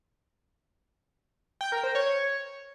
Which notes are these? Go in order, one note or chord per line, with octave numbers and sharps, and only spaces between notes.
G5
A#4
C5
C#5